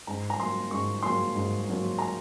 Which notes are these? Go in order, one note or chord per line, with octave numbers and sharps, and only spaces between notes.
G#2 A#5
A#5
F#3 A#3 C6
G#2 C#6
F#3 A#3 C6
G#2
F#3 A#3
A#5